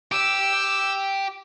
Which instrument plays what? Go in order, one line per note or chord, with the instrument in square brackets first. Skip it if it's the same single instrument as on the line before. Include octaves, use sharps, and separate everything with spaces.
[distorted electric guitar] G4 [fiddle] E6